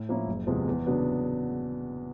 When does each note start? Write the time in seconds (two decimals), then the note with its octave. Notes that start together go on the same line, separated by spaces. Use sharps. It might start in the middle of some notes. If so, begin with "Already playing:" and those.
Already playing: A2
0.09 F3 A#3 C#4 E4
0.27 F#1
0.47 E2 C3 F3 G#3
0.67 E2
0.87 C#3 F#3 B3 D4